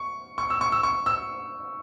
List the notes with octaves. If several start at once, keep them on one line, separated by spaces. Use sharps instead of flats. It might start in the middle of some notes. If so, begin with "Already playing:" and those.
Already playing: C#6
C#6
E6
C#6
E6
C#6
E6